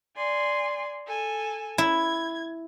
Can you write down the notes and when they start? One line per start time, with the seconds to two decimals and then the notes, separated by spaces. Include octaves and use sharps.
0.16 D5 G#5 C6
1.07 A4 G#5
1.78 E4 G#6